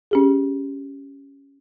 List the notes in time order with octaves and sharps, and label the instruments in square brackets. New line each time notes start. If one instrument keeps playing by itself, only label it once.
[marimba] C#4 G4 G#4